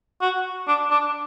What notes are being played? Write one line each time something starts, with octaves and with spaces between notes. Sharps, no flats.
F#4
D4
D4